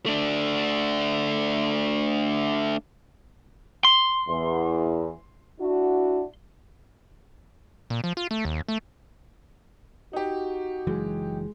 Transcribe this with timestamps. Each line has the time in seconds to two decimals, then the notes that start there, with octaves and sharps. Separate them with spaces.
0.06 A3 D4
3.85 C6
4.28 E2
5.59 D4 E4 F#4
7.90 A#2
8.04 F3
8.17 F4
8.31 A3
8.45 D#2
8.68 A3
10.13 D#4 F#4 G4
10.87 F#1 E3 F#3 G#3